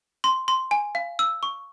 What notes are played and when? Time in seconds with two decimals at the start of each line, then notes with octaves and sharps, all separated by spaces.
0.24 C6
0.48 C6
0.71 G#5
0.95 F5
1.19 E6
1.43 C#6